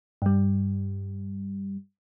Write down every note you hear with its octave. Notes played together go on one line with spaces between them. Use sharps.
G2 G3